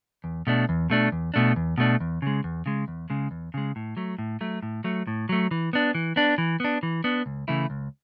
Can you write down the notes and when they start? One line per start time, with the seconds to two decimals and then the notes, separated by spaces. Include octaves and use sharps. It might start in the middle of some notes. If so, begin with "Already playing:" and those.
0.24 E2
0.47 B2 A3 D4
0.69 E2
0.90 B2 A3 D4
1.12 E2
1.34 B2 A3 D4
1.56 E2
1.78 B2 A3 D4
2.00 E2
2.22 C#3 G#3
2.44 E2
2.66 C#3 G#3
2.88 E2
3.10 C#3 G#3
3.31 E2
3.54 C#3 G#3
3.76 A2
3.97 F#3 A3
4.19 A2
4.41 F#3 A3
4.63 A2
4.84 F#3 A3
5.07 A2
5.29 F#3 A3
5.51 E3
5.73 B3 D4
5.95 E3
6.16 B3 D4
6.38 E3
6.60 B3 D4
6.83 E3
7.04 B3 D4
7.26 C#2
7.48 C#3 E3 A3 E4
7.70 C#2